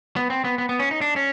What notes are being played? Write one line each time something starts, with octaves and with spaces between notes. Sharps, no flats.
B3
C4
B3
B3
B3
C#4
D#4
D4
C#4